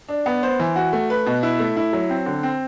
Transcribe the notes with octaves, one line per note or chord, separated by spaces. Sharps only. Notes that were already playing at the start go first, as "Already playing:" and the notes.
D4
B3
C5
E3
F#4
A3
B4
B2
E4
A3
E4
F#3
C4
D3
C4